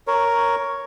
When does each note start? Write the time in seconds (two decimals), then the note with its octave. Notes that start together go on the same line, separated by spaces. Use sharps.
0.07 A#4 C#5